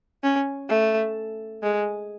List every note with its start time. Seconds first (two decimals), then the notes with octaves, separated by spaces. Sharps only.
0.24 C#4
0.69 A3
1.63 G#3